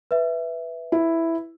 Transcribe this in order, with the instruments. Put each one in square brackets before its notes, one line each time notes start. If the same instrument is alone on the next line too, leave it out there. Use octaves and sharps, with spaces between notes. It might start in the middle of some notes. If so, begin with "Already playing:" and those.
[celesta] B4 E5
[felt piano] E4